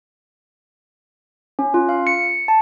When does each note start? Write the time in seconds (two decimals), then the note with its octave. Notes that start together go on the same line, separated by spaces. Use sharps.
1.59 C#4
1.74 F4
1.89 F5
2.07 C#7
2.48 A5